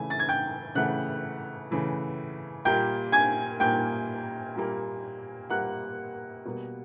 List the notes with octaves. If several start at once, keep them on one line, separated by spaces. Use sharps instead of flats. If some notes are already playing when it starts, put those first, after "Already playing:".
Already playing: C#3 E3 A3 G#5
A6
G#6
G5 G6
C#3 E3 A3 F#5 F#6
C#3 E3 A3
A#2 G3 A#3 G5 G6
G#5 G#6
A#2 G3 A#3 G5 G6
A#2 G3 A#3
A#2 G3 A#3 F#5 F#6
B2 G3 A#3